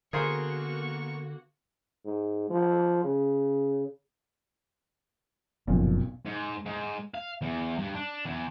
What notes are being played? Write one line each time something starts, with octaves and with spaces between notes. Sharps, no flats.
D3 A#3 B3 F#4 G#4 A#4 C5 C#6
G#2
F3
C#3
F#1 B1 F2 A#2 F3
G#2
G#2
F5
E2
G2
D4
E2